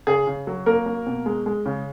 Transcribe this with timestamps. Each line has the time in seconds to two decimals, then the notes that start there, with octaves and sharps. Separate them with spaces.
0.07 C#3 G#4
0.27 C#3
0.47 F#3
0.66 A#3 A#4
0.86 A#3
1.06 B2
1.26 G#3
1.46 G#3
1.66 C#3